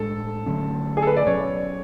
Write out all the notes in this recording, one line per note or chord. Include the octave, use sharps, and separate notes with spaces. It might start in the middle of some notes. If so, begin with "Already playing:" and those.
Already playing: A2 G#3 D4 A4
D3 F#3 A3 C#4
G#4
A4
B4
D5
B2 F#3 C#4 C#5